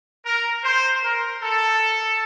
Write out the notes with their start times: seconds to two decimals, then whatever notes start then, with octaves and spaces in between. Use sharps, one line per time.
0.25 A#4
0.63 C5
1.03 A#4
1.42 A4